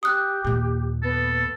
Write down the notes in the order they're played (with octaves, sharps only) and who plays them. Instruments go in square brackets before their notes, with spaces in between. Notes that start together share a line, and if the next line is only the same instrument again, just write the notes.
[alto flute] G4 [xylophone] D#6 F#6
[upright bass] D#2 A#2
[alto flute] B3 [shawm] A4